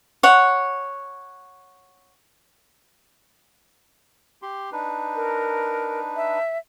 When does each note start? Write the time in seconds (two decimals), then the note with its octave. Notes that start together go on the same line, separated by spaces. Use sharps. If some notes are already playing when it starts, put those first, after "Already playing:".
0.23 C#5 F#5
4.42 G4 C6
4.72 D4 D#4 B4
5.16 A#4
6.16 E5